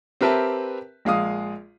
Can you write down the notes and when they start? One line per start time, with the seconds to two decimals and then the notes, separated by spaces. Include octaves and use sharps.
0.21 C4 G4 A#4 B4 E5 A5
1.05 A#1 G#3 F5 D#6